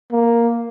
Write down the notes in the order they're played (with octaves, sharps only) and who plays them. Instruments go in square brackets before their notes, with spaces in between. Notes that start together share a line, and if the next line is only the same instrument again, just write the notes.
[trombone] A#3